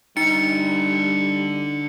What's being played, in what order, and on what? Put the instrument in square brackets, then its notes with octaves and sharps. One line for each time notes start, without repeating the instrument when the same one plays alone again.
[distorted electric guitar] D3 G5 [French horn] G3 [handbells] D#4 [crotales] C#7